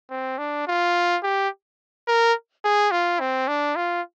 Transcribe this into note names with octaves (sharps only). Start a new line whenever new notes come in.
C4
D4
F4
G4
A#4
G#4
F4
C4
D4
F4